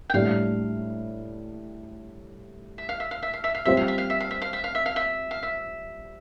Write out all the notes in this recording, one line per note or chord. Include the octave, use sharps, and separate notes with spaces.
G5
A2 G3 D4 F5
E5
F5
E5
F5
E5
F5
E5
F5
G3 C4 F4 C5 E5
F5
E5
F5
E5
F5
E5
F5
E5
F5
E5
F5
E5
F5
E5